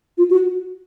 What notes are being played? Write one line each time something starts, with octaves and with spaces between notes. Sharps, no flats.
F4
F#4